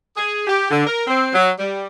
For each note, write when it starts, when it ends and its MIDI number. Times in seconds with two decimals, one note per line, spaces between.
0.17 0.46 68
0.47 0.67 67
0.71 0.86 50
0.86 1.02 70
1.07 1.28 60
1.34 1.50 54
1.59 1.86 55